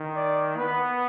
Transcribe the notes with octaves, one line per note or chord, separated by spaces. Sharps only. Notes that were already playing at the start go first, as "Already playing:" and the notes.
Already playing: D#3
D5
B3 B4